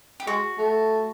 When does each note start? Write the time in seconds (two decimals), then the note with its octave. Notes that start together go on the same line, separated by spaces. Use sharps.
0.20 G4
0.27 G#3 F#4
0.58 A3